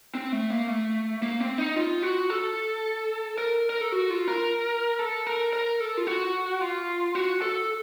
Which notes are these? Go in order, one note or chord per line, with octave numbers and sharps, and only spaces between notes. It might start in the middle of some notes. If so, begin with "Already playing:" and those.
C4
A3
A#3
A3
A#3
C4
D#4
F4
F#4
A4
A#4
A#4
A4
F#4
F4
A#4
A4
A#4
A#4
A4
F4
F#4
F4
F#4
A4